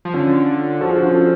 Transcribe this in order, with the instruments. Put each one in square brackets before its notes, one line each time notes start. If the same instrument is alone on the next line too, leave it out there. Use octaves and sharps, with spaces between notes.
[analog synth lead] F3
[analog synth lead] D3 [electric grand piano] C#4 F4
[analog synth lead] F3 [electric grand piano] F#4 A4
[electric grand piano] F4 G#4
D4 F#4
C#4 F4
F#4 A4